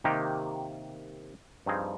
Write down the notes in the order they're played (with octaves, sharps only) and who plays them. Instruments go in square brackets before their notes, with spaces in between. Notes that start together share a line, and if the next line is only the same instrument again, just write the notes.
[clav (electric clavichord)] C3 D#3 A#3 D#4 G4
G2 F3 C4 D#4 G#4